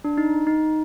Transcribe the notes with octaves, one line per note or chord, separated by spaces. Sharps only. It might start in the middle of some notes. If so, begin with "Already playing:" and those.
D4
D#4
D#4